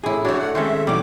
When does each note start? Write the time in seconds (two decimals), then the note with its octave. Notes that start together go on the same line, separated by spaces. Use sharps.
0.04 A2 C3 E4 G#4
0.25 A3 D4 F#4 C#5
0.38 F#5
0.55 D#3 G#3 C4 C#4 A4 E5
0.87 B2 E3 F#3 G3 D6